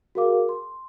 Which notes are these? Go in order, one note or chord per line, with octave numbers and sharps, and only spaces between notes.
F#4 G#4 A#4 F5 D6
C6